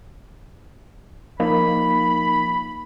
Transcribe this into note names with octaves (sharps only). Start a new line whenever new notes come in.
F3 A#3 D#4 B5